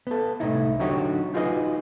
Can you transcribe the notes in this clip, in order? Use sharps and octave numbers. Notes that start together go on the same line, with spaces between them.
B3 A4
C2 A2 D#4 E4
D3 F#3 D#4 F#4 G4 C#5
D#4 F4 F#4 G#4 B4 D#5